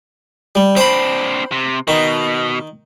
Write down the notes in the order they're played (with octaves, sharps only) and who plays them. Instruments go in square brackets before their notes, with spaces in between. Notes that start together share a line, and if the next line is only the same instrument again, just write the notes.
[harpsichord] G3
[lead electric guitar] C4 D4 [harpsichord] C5 B5
[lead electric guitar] C3
[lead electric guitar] B2 [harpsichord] D#3